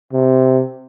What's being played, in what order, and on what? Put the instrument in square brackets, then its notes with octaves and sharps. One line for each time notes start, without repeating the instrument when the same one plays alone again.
[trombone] C3